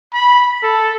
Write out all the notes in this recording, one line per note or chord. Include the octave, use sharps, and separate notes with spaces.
B5
A4